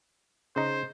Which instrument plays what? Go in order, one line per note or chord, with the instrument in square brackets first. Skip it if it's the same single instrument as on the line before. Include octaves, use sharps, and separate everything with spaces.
[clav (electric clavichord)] C#3 D#4 [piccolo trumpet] C5